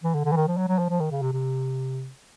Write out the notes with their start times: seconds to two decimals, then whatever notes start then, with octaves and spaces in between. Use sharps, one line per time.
0.04 E3
0.14 D3
0.25 D3
0.32 E3
0.36 D#3
0.47 F3
0.57 F#3
0.68 F#3
0.79 F3
0.89 F3
1.00 D#3
1.11 C#3
1.22 C3
1.32 C3